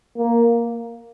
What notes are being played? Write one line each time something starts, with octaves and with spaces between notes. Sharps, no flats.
A#3